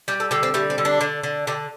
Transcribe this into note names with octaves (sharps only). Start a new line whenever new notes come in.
G3 G4
A4
D3 G4
C4
G3 A3
C4
D3
D4
D3
D3
D3 G4